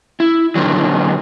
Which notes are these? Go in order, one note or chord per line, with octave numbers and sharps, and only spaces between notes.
E4
A#2 D3 D#3 F#3